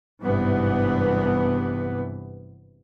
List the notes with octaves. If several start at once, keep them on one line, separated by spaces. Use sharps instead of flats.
G#1 G2 C3 E3 B3